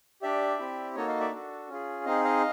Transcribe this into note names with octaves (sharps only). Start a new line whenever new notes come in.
D4 G4 D5 E5
C4 E4 G4
A#3 D#4 F#4 A4 C#5 D#5
D#5 F5
D5 E5
D4 F#4 A4
C#4 F4 G#4
C4 D#4 G#4 D#5 F5
D#5 F5